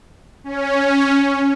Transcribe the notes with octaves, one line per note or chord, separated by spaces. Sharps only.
C#4